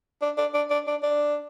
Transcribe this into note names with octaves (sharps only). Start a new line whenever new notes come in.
D4
D4
D4
D4
D4
D4